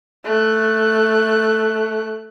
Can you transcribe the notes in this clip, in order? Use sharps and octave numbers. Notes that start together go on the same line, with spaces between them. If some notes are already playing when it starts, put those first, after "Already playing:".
A3 F#6